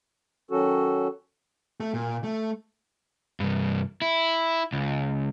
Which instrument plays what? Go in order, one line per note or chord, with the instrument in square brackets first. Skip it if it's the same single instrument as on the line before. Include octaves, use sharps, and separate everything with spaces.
[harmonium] D#3 F#3 C#4 F#4 A4
[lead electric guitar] A3
A#2
A3
[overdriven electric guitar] C2 G2
E4
C#2